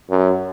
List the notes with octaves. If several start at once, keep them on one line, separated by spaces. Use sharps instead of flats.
F#2